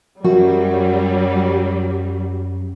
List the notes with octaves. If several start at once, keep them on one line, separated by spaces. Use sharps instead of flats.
F#2 F#3 G3 F#4